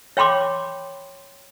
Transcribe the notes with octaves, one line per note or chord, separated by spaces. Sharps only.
C#5 G5 B5 C6 D6